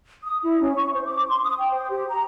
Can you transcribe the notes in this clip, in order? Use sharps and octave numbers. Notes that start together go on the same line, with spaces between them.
D#6
E4
C#4
C#6
C5
D6
C6
D#6
G5
C5
G4
A#5